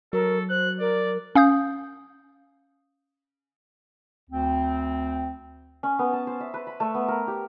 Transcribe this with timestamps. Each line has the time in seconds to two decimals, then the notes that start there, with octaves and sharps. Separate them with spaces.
0.13 F#3 A4 A#4
0.49 C5 F#6
0.80 A#4 D5
1.35 C#4 F5 D#6 G6
4.29 D2 C4
5.83 C#4
5.99 B3
6.13 A5
6.27 C5
6.40 E5
6.54 B4
6.67 B5
6.80 A3
6.95 B3
7.08 A#4
7.28 G4